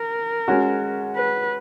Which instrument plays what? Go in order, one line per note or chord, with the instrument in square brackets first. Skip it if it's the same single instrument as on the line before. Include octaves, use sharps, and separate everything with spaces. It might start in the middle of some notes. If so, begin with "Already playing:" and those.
Already playing: [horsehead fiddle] A#4
[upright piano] G#3 C#4 F#4
[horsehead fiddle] B4